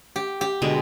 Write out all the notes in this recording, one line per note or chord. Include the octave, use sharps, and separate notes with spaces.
G4
G4
B2 D3 G#3